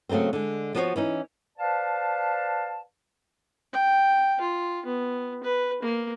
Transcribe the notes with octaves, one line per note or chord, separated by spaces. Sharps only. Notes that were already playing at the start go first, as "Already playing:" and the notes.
C#3 F#3 A3 A#3 C4
D3 G#3
F3 B3 F#4 A#4 C5 C#5
E3 C#4 D#4
B4 C5 D5 F5 A5
G5
F4
B3
B4
A#3